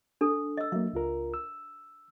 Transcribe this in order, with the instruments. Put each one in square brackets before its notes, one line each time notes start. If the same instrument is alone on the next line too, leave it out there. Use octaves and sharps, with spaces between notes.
[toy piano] D4 A4
D#5 E6
[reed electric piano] F#3 A#3 [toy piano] E5
[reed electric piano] C#2 F4 A#4
E6